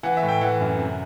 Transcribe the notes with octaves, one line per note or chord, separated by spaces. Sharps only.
E3 F#5
E5
A2
G5
E3 F#5
F#2
C3